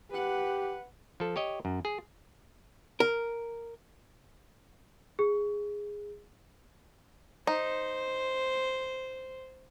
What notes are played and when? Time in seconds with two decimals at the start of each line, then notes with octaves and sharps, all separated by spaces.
0.11 G4 B4 F#5
1.20 F3 A4
1.36 G4 C#5 D#5
1.65 F#2
1.85 G#4
3.00 A#4
5.19 G#4
7.47 D#4 C5